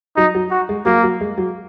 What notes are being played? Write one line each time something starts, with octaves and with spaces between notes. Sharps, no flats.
F#3 D#4
F#3
F#4
G#3
F#3 A#3
F#3
G#3
F#3